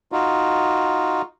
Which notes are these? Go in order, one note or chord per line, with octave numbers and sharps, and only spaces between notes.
D#4 F4 F#4